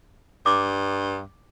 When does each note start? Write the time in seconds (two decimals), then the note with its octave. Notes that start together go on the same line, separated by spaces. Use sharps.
0.46 G2 D6